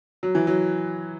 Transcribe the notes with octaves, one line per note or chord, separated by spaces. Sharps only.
F#3
E3
F#3